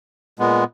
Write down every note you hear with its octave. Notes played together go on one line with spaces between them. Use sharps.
A#2 G#3 B3